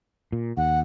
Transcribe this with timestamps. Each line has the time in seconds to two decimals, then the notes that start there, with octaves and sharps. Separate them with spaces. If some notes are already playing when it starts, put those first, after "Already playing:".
0.32 A#2
0.57 D#2 F#5